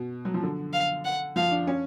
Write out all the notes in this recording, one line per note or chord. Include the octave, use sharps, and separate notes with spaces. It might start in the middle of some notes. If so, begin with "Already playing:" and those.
Already playing: B2
F#3
F3
D3
F5
F#5
F3 F5
D4
C#4